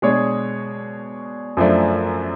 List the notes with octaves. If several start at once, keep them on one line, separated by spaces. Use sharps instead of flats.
B2 G#3 D4 G#4 C#5
F#2 F3 A3 D4